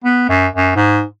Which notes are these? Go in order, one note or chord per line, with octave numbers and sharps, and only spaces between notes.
B3
F#2
F#2
G#2